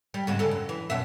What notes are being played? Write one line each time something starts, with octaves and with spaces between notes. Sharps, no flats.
G3
G#2 C#3 C4
C#3 A4
F#2
E3
F#2 B2 E5